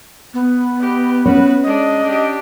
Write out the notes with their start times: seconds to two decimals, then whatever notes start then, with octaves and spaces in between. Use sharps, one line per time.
0.34 B3
0.80 G4 D#5
1.26 C#4 F#4 B4 C#5
1.63 G#3 D4 D#5
2.03 D4 G4